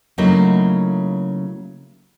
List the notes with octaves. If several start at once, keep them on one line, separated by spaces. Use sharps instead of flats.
C#3 F#3 A3 A#3 D#4 E4